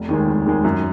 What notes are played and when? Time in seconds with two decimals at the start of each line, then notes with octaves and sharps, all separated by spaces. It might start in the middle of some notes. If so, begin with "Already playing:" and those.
Already playing: F1
0.09 D#2 D#3 G#3
0.27 F1
0.46 D#2 D#3 G#3
0.64 F#2